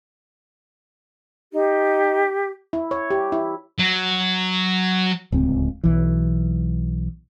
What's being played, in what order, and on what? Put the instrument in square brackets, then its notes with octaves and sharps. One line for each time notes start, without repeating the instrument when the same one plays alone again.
[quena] D#4 [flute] G4
[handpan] E4
C#5
G4
E4
[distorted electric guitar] F#3
[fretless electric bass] D1 C#2 C4
B1 E3